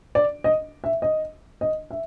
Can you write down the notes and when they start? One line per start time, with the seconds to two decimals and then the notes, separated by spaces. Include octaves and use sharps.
0.15 D5
0.44 D#5
0.84 E5
1.02 D#5
1.61 D#5
1.91 E5